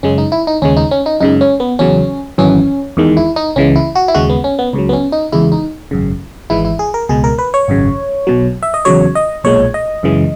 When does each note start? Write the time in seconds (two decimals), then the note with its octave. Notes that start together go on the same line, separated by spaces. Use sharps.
0.03 F#2 C#3 G#3 C#4
0.18 D#4
0.32 E4
0.47 D#4
0.62 D#2 C#3 G#3 C#4
0.77 D#4
0.91 C#4
1.06 D#4
1.21 F#2 C#3 G#3 D#4
1.41 C#4
1.60 B3
1.79 E2 C#3 F#3 C#4
2.38 G#1 F#2 E3 C#4
2.97 E2 D#3 G#3
3.17 E4
3.36 D#4
3.56 C#2 C#3 E3 G#3 C#4
3.76 E4
3.95 F#4
4.08 E4
4.14 D#2 C#3 G#3 F#4
4.30 B3
4.44 C#4
4.59 B3
4.73 C#2 C#3 F#3
4.89 B3
4.93 C#4
5.12 D#4
5.32 E2 C#3 G#3 E4
5.52 D#4
5.91 G#1 F#2 C#3
6.50 G#1 G#2 E3 G#3 E4
6.65 E4
6.79 G#4
6.94 A#4
7.09 C#2 B2 G#3 G#4
7.24 A#4
7.39 B4
7.54 C#5
7.68 G#1 F#2 C#3
8.27 B1 B2 F#3
8.63 E5
8.74 D#5
8.85 E2 C#3 F#3 C#5
9.15 D#5
9.44 B1 A#2 G#3 C#5
9.74 D#5
10.03 F#2 C#3 E3 G#3